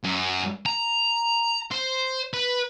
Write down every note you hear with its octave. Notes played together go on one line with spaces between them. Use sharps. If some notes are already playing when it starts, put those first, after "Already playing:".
F#2
A#5
C5
B4